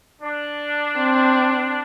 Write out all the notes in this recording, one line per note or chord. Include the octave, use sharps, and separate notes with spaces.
D4
C4